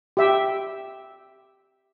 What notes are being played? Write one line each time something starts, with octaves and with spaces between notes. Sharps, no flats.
G4 E5 G5